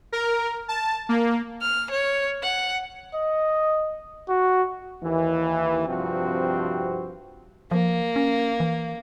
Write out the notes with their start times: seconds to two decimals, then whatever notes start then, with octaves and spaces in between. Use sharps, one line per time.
0.12 A#4
0.68 A5
1.09 A#3
1.61 F6
1.91 C#5
2.42 F#5
3.15 D#5
4.29 F#4
5.03 D#2 E3
5.87 G2 C3 F3 C4 F#4
7.71 F3 A#3
8.16 C#4
8.60 E3